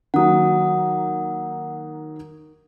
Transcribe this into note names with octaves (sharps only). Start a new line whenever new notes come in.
D#3 F#3 A#3 F#5 D#6